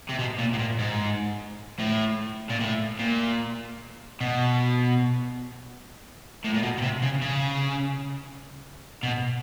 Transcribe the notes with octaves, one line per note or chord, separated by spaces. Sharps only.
C3
B2
A#2
A2
A#2
G#2
A2
A#2
A2
A#2
B2
A2
A#2
B2
B2
C3
C#3
C#3
B2